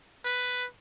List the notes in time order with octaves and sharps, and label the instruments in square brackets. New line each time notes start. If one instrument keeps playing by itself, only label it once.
[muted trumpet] B4